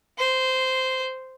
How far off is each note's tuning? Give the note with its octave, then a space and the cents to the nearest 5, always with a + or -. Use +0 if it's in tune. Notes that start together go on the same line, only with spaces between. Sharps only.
C5 -10